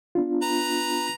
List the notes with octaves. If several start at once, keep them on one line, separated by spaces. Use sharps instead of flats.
B3 D4 F4
B4 A#5